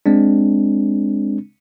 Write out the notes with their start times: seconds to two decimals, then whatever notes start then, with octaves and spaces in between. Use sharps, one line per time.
0.06 G#3 C4 D4